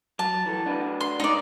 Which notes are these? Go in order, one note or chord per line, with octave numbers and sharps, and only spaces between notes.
F#3 A5
E3 A4
D4 F#4 B4
C6
G#2 D4 D#4 D5